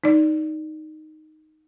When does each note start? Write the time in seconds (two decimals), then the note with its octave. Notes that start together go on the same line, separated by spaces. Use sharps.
0.04 D#4 D5